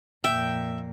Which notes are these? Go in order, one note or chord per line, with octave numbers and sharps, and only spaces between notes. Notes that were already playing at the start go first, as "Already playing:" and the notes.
F2 A#2 E5 G5